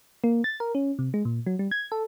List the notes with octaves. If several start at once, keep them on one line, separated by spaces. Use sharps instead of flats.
A#3
A6
A#4
C#4
C3
G#3
A#2
F#3
G3
G#6
A4